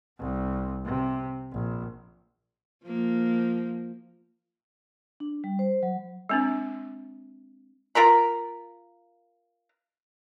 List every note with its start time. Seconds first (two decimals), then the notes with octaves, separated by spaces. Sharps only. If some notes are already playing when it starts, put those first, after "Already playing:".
0.18 C2
0.84 C3
1.52 A#1
2.84 F3 A#3
5.20 D4
5.44 G3
5.59 C5
5.83 F#3
6.29 G#3 C4 D4
7.95 F4 A#4 A#5 B5